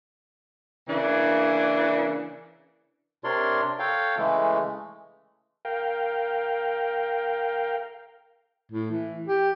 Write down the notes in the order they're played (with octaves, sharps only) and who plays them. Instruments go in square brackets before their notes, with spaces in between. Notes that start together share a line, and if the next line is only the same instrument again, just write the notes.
[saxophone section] C#3 E3 A#3 D4
[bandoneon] C3 D4 A#4 C#5 D5 C6
A4 C#5 F5 G5
C#3 E3 G#3 A3
[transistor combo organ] A#4 F5 G5
[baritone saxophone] A2
E3
G4